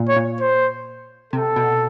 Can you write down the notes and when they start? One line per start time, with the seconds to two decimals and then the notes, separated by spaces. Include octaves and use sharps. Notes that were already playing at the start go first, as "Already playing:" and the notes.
Already playing: A#2
0.09 C#5
0.16 A#2
0.41 C5
1.33 C3 A4
1.56 B2